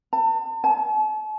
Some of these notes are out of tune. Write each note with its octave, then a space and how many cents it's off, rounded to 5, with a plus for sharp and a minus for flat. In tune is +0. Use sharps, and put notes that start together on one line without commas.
A5 +35
A5 -40